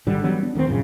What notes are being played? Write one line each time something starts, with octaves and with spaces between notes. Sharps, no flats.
G#1 D3 G3
E3 F#3 G3 B3
B3 D4
D2 D#3 A3 C4
A#1 F#2 C#3